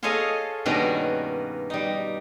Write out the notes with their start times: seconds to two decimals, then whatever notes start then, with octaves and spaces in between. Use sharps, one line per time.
0.03 F4 G#4 A4 C#5 D#5 F5
0.65 G2 B2 D#3 A#3 C#4 F#4
1.70 G3 D#4